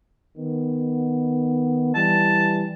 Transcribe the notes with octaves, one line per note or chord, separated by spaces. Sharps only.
D#3 B3
E3 G3 A5